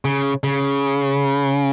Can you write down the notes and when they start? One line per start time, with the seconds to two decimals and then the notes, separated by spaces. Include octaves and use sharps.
0.05 C#3
0.44 C#3